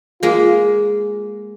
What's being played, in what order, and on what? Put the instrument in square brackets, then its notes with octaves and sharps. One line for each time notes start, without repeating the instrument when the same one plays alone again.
[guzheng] G#3 A#3 [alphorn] F4